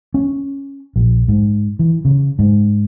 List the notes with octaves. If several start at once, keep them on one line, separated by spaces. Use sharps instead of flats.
C#4
A#1
G#2
E3
C#3
G#2